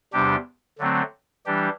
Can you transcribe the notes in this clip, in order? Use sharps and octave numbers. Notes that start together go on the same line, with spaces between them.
E2 C3 G3 D4 G4
D3 F#3 A3 C4
E3 G3 D4 G4